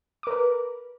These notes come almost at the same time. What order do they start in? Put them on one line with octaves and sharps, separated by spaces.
D6 A#4 B4